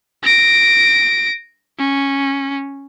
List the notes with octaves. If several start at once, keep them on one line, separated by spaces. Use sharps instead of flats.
A#6 D7
C#4